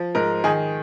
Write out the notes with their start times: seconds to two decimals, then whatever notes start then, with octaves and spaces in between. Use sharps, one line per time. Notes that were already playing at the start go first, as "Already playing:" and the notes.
Already playing: F3
0.15 G#2 A#4
0.44 D#3 G#4